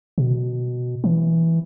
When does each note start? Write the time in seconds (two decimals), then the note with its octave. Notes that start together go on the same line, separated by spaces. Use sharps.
0.18 B2
1.04 E3